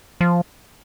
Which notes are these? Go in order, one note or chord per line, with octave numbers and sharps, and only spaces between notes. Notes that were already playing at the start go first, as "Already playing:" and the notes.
F3